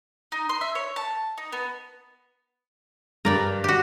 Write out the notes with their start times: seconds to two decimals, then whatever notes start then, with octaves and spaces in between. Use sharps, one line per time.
0.32 D#4
0.49 C6
0.61 E5
0.75 C#5
0.96 A5
1.38 D#4
1.52 B3
3.25 G2 A#4 D5 G5
3.64 F#4 G4